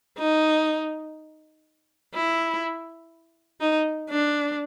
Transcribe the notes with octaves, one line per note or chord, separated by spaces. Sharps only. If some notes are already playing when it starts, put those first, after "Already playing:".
D#4
E4
D#4
D4